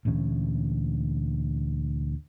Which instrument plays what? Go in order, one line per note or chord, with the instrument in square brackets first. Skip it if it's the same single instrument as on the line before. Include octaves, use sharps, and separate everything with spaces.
[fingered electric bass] D2 A#2 E3 C#4